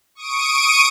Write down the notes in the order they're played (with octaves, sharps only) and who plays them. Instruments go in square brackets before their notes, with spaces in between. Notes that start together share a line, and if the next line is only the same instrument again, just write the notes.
[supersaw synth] C#6 D#6 D7 D#7